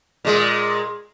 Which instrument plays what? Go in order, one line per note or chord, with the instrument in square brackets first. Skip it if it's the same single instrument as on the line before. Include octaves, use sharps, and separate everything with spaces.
[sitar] A#2 G#3